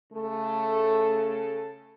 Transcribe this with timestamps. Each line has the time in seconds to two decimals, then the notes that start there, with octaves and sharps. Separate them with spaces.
0.13 C#3 A3 A4